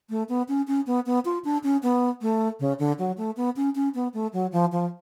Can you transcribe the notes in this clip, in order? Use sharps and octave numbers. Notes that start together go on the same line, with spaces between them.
A3
B3
C#4
C#4
B3
B3
F4
D4
C#4
B3
A3
C#3
D3
F#3
A3
B3
C#4
C#4
B3
A3
F#3
F3
F3